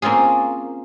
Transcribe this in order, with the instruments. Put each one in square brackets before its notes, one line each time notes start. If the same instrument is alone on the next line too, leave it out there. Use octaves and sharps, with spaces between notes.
[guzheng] A#3 C4 C#4 F4 G#4